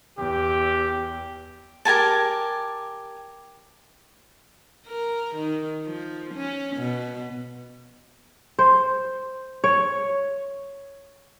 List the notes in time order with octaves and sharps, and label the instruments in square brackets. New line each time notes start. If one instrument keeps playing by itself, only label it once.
[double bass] E2 [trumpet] G4
[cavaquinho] G4 A#4 G#5 A5
[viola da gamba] A#4
D#3
F3
C#4
B2
[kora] C5
C#5